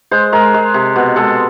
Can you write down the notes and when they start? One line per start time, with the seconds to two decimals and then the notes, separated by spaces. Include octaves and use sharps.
0.11 G#3 C5
0.32 G#3 A#4
0.54 G#3
0.74 C3
0.96 B2
1.16 G#3 A4